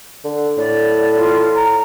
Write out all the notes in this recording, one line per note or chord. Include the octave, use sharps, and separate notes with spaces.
D3
A2 D5
F4
A#5